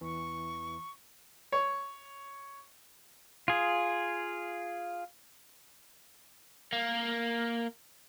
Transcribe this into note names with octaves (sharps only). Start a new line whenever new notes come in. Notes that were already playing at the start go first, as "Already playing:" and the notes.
E2 E3 C#6
C#5
F4 G#4
A#3